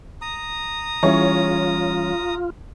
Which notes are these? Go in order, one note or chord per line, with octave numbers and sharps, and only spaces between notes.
A#5 D#6
E3 G3 C#4 E4 F4 G#4 C#5